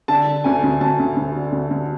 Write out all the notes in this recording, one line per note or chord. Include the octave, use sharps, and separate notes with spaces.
D3 A5
D3
D2 G#5
D2
D2 A5
D2
D2
D3
D2
D2